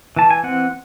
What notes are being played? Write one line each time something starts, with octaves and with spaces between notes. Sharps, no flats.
E3 A5
G#5
C4 F#5